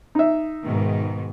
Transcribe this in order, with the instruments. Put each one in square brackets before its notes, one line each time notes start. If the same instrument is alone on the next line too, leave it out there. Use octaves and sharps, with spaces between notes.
[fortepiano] D#4 E5
[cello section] G#2 B2 D#3